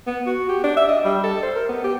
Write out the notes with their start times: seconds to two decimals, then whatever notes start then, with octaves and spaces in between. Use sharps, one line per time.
0.07 B3
0.26 F#4
0.49 G4
0.64 D4
0.77 E5
0.88 D#5
1.04 G3
1.23 A4
1.43 C5
1.55 A#4
1.69 B3
1.84 G4